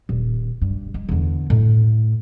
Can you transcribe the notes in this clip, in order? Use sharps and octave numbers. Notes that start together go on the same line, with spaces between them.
D#1
G2
G#3
E2 D3
A2